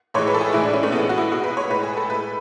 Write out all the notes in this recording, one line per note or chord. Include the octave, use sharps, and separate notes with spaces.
A2 E3 G#3 C#5
B4
A4
G#4
A2 E3 G#3 E4
D4
C#4
A3
A2 G#3 B3
F#4
E4
B2 G#3 F#4
B4
C#5
A2 G#3 B4
G#4
A4
A2 G#3 B4